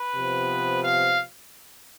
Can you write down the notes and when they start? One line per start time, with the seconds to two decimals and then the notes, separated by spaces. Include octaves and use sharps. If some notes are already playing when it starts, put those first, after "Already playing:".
Already playing: B4
0.16 C3 F3 B3
0.84 F5